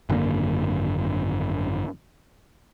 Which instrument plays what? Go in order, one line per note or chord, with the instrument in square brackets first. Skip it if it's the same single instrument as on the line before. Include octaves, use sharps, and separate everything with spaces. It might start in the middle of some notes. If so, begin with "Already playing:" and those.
[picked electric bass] G#1 F#2 D3 A#3